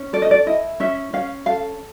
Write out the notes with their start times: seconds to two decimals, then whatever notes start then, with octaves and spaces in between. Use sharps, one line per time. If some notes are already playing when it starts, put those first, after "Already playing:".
Already playing: C#4
0.13 A4 D5
0.22 D#5
0.31 D5
0.47 E4 D#5
0.80 C#4 E5
1.13 C#4 F5
1.46 A4 F5